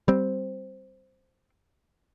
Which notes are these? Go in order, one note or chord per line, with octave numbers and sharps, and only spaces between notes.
G3 C4